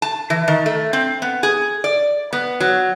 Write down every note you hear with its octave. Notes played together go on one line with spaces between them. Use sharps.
A5
E3
D#3
A3
C4
B3
G#4
D5
B3
F#3